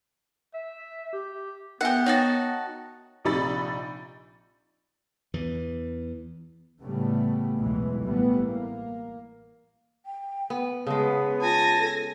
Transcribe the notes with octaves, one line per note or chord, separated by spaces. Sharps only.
E5
G4
B3 G4 A#4 E5 F#5 G#5
D#4 F#4 C#5 G5 A5
A#1 C3 D#4 B5 A6
E2 E3
A2 C#3 G3 A3 B3
B1 E2 B2 E3 G#3
A1 E3 G3 A3 B3
A#3
G5
B3
C#3 G#3 B3 A5
F4 G#5 A5 A#6
A4